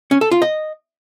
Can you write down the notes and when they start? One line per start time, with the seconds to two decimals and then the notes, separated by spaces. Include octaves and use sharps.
0.11 C#4
0.21 A4
0.31 F4
0.42 D#5